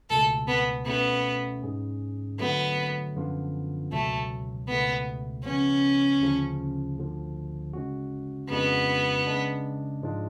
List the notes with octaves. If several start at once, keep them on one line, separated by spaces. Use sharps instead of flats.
C#2 B2 A3 A4
B3
B2 A3 B3 C#4
G#2 G#3 C#4 G#4
D3 F#3 A3 B3
F#2 D3 F3 B3 F4
C#2 B2 F#3 A3
C#2 B2 A3 B3
C#3 F3 B3 C#4
D2 C#3 F3
D2 D3 F3
C#3 G#3 C#4 F#4
F2 C#3 G#3 B3 D4 F#4
C#3 G#3 D4
G#2 F3 G#3 D4 F4